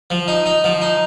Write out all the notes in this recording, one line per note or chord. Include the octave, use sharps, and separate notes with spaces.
F3
D#4
D#4
F3
D#4